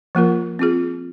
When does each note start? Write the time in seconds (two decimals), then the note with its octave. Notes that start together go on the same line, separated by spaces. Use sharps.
0.15 F3 A#3 F4 A#4
0.59 C4 F4 G#4